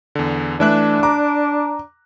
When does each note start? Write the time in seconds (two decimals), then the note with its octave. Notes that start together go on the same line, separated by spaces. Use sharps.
0.15 E2 D3
0.60 E3 A3 D4 E5 F#6
1.03 A#5 D6